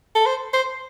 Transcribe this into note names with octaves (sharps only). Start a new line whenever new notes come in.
A4
C5
C5